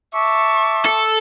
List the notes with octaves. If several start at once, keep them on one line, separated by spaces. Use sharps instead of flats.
E5 A5 C#6 D6
A4